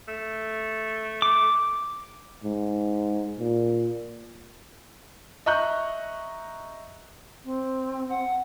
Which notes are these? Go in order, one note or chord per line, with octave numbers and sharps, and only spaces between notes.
A3
D6
G#2
A#2
D#5 E5 A#5 C#6 F#6 G6
C4
F#5